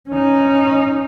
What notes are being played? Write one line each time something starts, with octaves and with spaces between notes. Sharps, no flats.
C#4 D#4